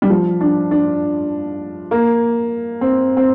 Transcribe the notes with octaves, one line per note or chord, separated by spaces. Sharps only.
G3
F3
D4
D4
A#3
C4
C4